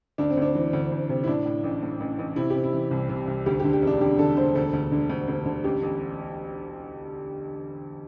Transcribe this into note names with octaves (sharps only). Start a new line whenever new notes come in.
D2 D4
C4
D2
D4
E3
D2
D2
C3
E4
A2 D4
A2
A1
A2
A1
A1
C3 E4
C3 G4
E4
E3
C2
C3
C2
D2 G4
G4
D3
G4
E1 D4
D3 G4
D3 A4
E1 C5
D2 A4
D2
D3
D2
D2
D3
A1 G4
A1